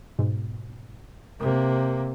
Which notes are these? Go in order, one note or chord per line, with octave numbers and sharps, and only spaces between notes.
G#2 B2
C3 A#3